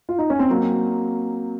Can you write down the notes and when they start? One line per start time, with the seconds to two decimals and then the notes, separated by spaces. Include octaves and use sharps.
0.09 F4
0.18 D#4
0.30 C#4
0.39 C4
0.50 F#3 A#3